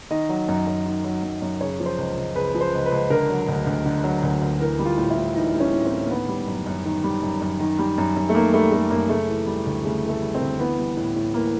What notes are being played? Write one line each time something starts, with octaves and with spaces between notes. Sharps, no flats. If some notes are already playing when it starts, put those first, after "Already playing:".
D#3 D#5
F#3
F#2
F#2
D#3
F#3
F#2
F#2
C#3 C#5
F3
C5
C#2
C#2
C#3 B4
F3
C5
C#2
B4
C#2
D3 A#4
F#3
D2
D2
D3
F#3
D2
D2
E3 A#4
G3
F4
A2
E4
A2
E3 D#4
G3
C#4
A2
C4
A2
A#3
D#3 B3
G3
F#2
F#2
D#3
G3
F#2
F#2
D#3
G3
F#2
F#2
A3
D#3 A#3
G3 A3
F#2 A3
F#2 A#3
C#3 A3
E3
G3
D2
C#3 A3
E3
A3
G3
C4
D2
E3 B3
G3
A2
A2
E3 A#3